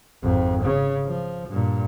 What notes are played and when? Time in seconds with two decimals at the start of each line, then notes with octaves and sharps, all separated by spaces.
0.22 G#1 F2
0.63 C#3
1.05 F3
1.48 G2 A#2